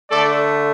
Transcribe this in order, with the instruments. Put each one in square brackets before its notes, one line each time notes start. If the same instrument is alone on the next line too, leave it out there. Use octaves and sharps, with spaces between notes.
[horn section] D3 A3 A4 D5